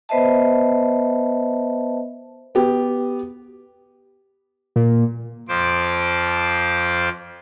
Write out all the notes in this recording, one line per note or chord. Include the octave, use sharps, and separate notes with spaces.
B3 B4 C5 D#5 E5 A5
B3 G4
A#2
F2 F3 C5 D6